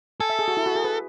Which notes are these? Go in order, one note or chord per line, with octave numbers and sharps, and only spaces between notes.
A4 G#5
E5
G#4
F#4
E4
F#4
G#4
B4